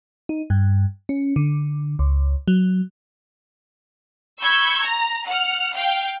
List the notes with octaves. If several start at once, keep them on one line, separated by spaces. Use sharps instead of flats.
D#4
G2
C#4
D3
C#2
F#3
B5 C#6 E6 G6 G#6
A#5
F#5 F6
F5 G5